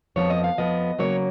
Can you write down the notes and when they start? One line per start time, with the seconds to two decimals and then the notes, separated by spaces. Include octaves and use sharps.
0.16 F2 F3 B3 C#5
0.30 D#5
0.44 F5
0.57 F2 F3 B3 D#5
0.99 C#3 F#3 A#3 C#5